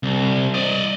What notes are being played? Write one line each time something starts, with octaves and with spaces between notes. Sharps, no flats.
C2
D5 D#5